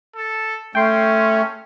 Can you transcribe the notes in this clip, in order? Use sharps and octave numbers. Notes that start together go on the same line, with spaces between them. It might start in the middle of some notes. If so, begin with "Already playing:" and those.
A4
A3 C#4 G5 C6